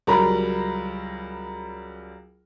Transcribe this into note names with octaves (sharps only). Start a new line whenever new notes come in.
C#2 F#3 G3 A#4 A#5 B5